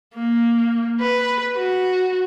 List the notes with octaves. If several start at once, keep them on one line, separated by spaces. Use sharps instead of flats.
A#3
B4
F#4